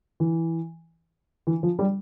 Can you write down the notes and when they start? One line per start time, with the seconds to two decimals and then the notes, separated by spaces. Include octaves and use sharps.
0.20 E3
1.47 E3
1.63 F3
1.79 G3